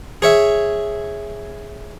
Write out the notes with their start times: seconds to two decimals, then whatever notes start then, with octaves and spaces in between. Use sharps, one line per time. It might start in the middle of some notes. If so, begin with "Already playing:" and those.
0.22 G#4 C#5 E5